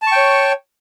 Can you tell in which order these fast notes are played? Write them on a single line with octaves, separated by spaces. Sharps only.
A5 C#6 G5 C#5